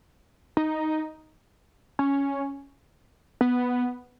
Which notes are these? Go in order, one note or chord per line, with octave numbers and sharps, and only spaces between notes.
D#4
C#4
B3